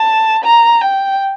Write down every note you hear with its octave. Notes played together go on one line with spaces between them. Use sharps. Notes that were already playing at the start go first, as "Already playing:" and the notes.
Already playing: A5
A#5
G5